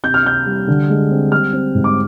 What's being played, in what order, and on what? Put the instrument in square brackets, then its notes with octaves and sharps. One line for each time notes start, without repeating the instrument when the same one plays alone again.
[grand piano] C3 G6
F6
C3 G6
G3
D3
G#3
C4
G3 F6
C4
G#2
D6